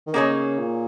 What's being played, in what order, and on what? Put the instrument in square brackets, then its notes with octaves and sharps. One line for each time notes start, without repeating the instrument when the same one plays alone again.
[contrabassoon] D#3
[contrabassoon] C#3 [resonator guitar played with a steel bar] A#3 D#4 G#4 C#5
[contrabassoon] A#2